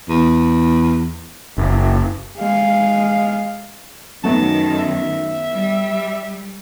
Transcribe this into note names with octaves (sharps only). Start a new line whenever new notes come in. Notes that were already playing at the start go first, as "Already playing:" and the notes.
E2
F#1
G#3 F5
F#2 D#3 F#3 A3 B3 A5
E5
G3